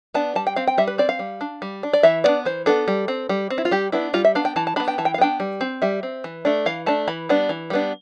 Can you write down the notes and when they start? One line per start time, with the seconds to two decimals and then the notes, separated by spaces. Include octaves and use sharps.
0.14 B3 D4 A5
0.35 G3 A5
0.47 G5
0.56 C4 F5
0.67 G5
0.78 G3 E5
0.87 B4
0.98 C4 D5
1.09 F5
1.19 G3
1.41 D4
1.62 G3
1.83 D4
1.93 D5
2.03 E3 E5
2.24 B3 D4 D5
2.45 E3 C5
2.66 B3 D4 A4
2.88 G3
3.08 C4
3.29 G3
3.50 C4
3.58 E4
3.65 F4
3.71 G3 G4
3.92 B3 D4 E4
4.13 G3 F4
4.25 E5
4.35 B3 D4 F5
4.45 G5
4.56 E3 A5
4.67 A5
4.76 D4 B5
4.80 B3
4.88 G5
4.98 E3 A5
5.05 G5
5.14 F5
5.18 B3 D4 G5
5.40 G3
5.61 C4
5.82 G3 E5
6.03 C4
6.24 E3
6.45 A3 D4
6.66 E3 F5
6.86 A3 D4 A5
7.08 E3 B5
7.29 G3 B3 D4
7.49 E3
7.70 G3 B3 D4